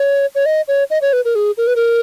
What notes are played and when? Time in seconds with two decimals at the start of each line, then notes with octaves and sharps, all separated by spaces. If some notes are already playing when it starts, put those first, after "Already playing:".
Already playing: C#5
0.35 C#5
0.46 D#5
0.68 C#5
0.90 D#5
1.02 C#5
1.13 B4
1.25 A#4
1.35 G#4
1.58 A#4
1.67 B4
1.76 A#4